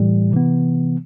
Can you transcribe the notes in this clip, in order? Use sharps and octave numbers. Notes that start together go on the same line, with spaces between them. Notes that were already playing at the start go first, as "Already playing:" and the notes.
Already playing: A2 E3 G3
C3 E3 B3